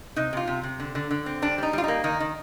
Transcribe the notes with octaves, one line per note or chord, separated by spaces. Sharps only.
C3 D#4
C3 F4
C3
C3
D3
D3
D3
C4
G3 D4
G3 D#4
G3 F4
A#3 D#4
D#3 D#4
D#3